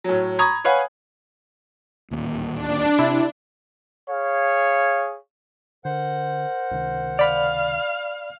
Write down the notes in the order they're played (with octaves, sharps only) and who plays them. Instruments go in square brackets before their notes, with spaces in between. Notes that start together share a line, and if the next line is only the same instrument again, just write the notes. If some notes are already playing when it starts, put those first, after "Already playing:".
[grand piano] A2 F#3
A#5 B5 C#6 D#6 G#6
B4 C#5 F5 F#5 G#5 B5
[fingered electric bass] D1 D#2 A#2
[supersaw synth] D4
[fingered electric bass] C3 [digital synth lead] E4
[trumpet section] G#4 C#5 F5
[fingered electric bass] D3 [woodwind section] A#4 C5 F#5
[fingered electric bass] C#2 C3 D#3
[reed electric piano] D5 B5 [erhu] F5